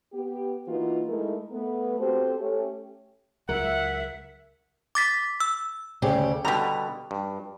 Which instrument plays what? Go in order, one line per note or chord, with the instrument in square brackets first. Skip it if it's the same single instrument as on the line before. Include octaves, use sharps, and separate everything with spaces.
[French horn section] B3 G4
E3 A#3 D#4 F4 F#4 B4
G#3 A3 D#4 E4 A#4
A3 B3
C4 F#4 G4 A4 C5
A3 C#4 G4
[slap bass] C#2 F#3 [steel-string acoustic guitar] A#4 [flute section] E5 [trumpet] F#5
[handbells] D6 A6 B6
E6
[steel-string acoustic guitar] D2 C#3 G4
[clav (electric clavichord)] B2 D3 G3 [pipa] G4 A#5
[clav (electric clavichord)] G2